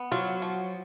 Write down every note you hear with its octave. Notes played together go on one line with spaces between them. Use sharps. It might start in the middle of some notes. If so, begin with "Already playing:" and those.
Already playing: B3
F#3 F4
F3